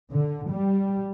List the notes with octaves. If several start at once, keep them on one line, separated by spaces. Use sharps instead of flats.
D3
G3